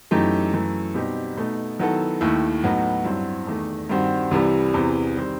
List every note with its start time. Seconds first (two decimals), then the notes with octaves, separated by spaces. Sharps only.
0.11 F#2 E3 A3 D#4 G4
0.54 F#2 E3 A3
0.94 B2 G3 C4 D#4 G4
1.37 B2 A3 D#4
1.79 D#3 F#3 B3 E4 A4
2.21 D#2 D#3 A3 E4
2.64 A2 F#3 B3 D#4 F#4
3.05 G2 F#3 C4 E4
3.47 E2 D#3 A3
3.89 G2 D#3 G3 C4 F#4
4.31 C2 C3 E3 G3
4.74 E2 C3 E3
5.16 D#3 G3 C4